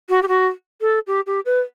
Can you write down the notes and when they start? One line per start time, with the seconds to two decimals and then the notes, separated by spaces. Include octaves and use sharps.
0.09 F#4
0.23 G4
0.28 F#4
0.81 A4
1.07 G4
1.27 G4
1.46 B4